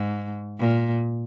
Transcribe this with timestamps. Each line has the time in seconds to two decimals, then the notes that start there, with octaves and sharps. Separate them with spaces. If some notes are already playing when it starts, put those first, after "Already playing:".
Already playing: G#2
0.59 A#2